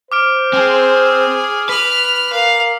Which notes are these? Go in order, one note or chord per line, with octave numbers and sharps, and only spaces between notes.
C5 D6 F6 D7
C4 G#4 F6
B4 F6 B6 F#7
A#4 F5